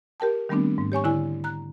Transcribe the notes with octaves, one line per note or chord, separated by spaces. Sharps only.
G4 A#4 G5 A5
D#3 G3 A3 B3 C4 D4
G#2
G4 C#5 G#5 C#6
D3 E4 G#5
A#5 F#6